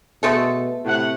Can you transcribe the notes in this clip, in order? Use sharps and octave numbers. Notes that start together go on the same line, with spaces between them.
B2 G#3 A3 A4
A2 C3 F#5